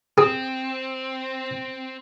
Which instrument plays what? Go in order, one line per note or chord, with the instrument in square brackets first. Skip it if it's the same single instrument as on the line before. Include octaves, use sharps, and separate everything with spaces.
[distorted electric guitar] C4 [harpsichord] G#4